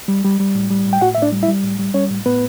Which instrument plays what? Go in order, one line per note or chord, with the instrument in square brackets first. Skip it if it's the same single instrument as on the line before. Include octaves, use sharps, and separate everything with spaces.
[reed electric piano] G3
G3
G3
A2
G3
A2
G5
A2 F#4 F#5
E5
A2 D4 D5
G3
E4 E5
G3
A2
G3
G3 C#4 C#5
A2
A2 B3 B4